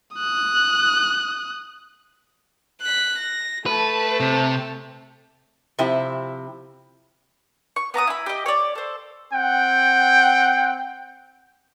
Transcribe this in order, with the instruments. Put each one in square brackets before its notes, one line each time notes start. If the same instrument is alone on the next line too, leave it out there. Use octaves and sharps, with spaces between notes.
[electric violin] D#6 F#6
[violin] F#6 B6
A#6
[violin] A3 A5 [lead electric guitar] B4
[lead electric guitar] C3
[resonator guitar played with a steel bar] C3 F3 C4 E4
[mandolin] C#6
B3 A#5 D6 D#6
E4 B5
G4 D#5
C#5 D5
A4 C5
[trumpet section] C4 F#5 G5